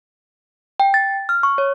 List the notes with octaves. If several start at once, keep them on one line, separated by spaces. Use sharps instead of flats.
G5
A6
F6
C#6
C#5